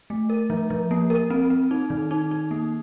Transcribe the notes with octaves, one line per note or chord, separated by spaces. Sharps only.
A3
A#4
F3
F3
A#3
A#4
C4
C4
D#4
D#3
D#4
D#4
A#3